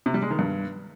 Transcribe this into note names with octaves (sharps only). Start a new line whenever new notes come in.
C3
G3
G#3
D#3
G2